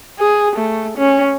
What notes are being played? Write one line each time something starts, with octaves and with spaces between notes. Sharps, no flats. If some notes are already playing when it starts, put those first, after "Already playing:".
G#4
A3
C#4